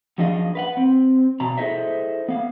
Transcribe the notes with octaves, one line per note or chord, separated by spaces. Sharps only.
F#2 F3 D4 G#4 D#5 F5
B4 F5 F#5
C4
B2 A#5
E4 G#4 A4 C5 D#5 E5
B3 F5